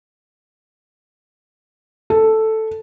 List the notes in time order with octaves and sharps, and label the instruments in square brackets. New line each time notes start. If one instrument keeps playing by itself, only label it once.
[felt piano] A4